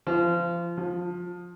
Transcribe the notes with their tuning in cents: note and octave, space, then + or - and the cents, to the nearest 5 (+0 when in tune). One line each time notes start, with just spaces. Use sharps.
F3 -25
F3 +20